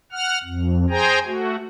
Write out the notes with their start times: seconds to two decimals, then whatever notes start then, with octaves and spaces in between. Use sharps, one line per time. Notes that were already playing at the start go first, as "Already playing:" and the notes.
0.12 F#5 F6
0.44 F2
0.90 G#4 C5 G5 G#5 A#5
1.26 A3 F#4